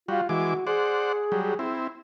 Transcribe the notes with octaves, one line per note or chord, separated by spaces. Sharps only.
G3 F4 F#4
E3 G#3 F#4 D6
G#4 C5 D5 F#5
F#3 G3
C4 E4